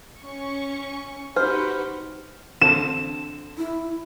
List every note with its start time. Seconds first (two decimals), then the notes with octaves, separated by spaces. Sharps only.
0.20 C#4 C#6
1.36 D#4 F#4 G4 B4 C5 F6
2.61 D3 C4 A5 E7
3.58 E4